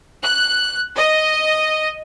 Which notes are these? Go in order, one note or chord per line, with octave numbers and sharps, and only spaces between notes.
F#6
D#5